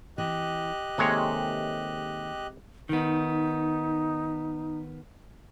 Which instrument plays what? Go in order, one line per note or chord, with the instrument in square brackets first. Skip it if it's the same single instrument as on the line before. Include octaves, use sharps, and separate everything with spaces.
[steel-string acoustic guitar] E3 C4 [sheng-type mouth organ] G4 D#5 F#6
[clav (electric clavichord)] C3 G#3 C#5 [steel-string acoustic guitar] D#3 A#3 A4
[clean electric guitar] D#3 B3 [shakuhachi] D#4